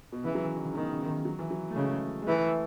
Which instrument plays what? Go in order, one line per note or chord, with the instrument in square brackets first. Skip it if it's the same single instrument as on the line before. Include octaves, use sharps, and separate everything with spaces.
[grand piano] B2
[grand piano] C#3 [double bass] E3
[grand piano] F#3
E3
D#3
C#3
[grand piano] B2 [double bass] D#3
[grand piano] C#3
D#3
F#3
E3
F#3
A3
[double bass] C#3 [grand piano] G#3
[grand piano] G#3
[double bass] E3 [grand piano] A3